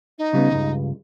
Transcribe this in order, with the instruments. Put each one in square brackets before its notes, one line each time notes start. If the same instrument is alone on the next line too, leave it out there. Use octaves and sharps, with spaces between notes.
[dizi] D#4
[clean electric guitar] C#3 G3 B3
C#2 G2